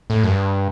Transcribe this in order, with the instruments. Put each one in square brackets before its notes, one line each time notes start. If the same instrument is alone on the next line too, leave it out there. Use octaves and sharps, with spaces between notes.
[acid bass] A2
F#2
G2